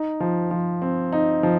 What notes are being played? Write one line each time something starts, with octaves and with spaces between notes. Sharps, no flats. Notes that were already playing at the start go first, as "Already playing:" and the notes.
Already playing: D#4
F3
F3
C4
D#4
F3